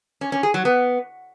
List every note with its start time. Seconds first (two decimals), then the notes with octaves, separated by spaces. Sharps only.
0.21 C#4
0.32 C#4
0.43 G#4
0.54 F#3
0.65 B3